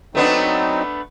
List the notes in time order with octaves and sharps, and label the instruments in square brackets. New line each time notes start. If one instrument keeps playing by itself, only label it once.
[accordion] F#3 C4 D#4 [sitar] A3 B3 D4